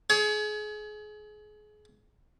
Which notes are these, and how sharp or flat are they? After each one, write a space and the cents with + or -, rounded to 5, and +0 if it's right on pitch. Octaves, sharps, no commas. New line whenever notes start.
G#4 +30 C#5 +35